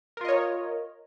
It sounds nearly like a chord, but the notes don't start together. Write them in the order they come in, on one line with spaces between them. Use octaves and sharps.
A#4 F4 D#5 C#5